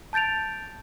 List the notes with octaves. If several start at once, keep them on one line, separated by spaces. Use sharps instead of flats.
A5 G6 A6 D7 F7